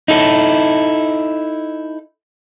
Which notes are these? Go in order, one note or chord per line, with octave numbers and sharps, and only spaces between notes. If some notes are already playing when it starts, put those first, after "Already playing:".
D#4 E4 A4